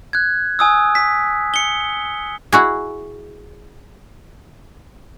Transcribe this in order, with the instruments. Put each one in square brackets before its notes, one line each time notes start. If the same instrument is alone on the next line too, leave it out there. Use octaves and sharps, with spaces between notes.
[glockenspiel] F#6 G#6
G#5 D#6 E6
B6
C#7 G7
[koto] E4 F#4 G#4